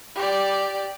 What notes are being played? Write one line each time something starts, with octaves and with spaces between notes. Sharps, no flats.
G4 D5